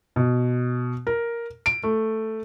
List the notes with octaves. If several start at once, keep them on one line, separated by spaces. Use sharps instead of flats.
B2
A#4
D7
A3